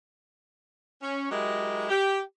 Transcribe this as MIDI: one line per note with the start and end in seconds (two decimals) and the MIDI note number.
1.03 1.30 61
1.31 1.89 54
1.31 1.89 56
1.31 1.89 64
1.31 1.89 67
1.31 1.89 70
1.31 1.89 75
1.89 2.20 67